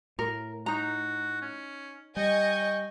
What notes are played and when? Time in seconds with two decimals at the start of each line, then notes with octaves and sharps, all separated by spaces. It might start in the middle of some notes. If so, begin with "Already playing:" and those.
0.19 A2 A#4
0.66 D#4 F#4 A#5
1.42 C#4
2.17 G3 D#5 G5 G#5 C#6